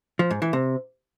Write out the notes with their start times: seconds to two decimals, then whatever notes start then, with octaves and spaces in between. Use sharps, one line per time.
0.19 F3
0.31 G#2
0.42 E3
0.53 C3